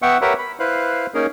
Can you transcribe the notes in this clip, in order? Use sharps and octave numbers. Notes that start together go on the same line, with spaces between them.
B3 E5 F#5 G5 C#6
G4 A#4 B4 C#5 E5 F#5
B5
E4 B4 C5 F5 F#6
A#3 C#4 D#4 G#4 A#4